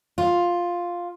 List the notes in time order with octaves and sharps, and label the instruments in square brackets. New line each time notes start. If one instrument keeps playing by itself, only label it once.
[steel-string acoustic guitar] F4